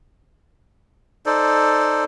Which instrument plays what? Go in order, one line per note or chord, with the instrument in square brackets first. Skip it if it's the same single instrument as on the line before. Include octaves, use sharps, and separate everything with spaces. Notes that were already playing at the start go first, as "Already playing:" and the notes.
[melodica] D#4 A4 C5 D5